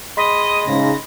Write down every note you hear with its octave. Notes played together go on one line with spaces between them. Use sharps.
G#3 D#5 B5 C6 B6
G#2 C#3 A#6